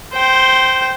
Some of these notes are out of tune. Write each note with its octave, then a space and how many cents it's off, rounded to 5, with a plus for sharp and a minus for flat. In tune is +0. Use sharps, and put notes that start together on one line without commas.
C5 +0 G5 -15